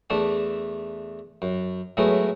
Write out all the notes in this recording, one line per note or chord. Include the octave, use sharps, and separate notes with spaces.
E2 A3 D4 A5
F#2
A2 F#3 G#3 A3 B3